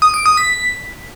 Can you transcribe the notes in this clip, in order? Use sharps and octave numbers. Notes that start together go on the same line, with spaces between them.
D#6
D7
D#6
B6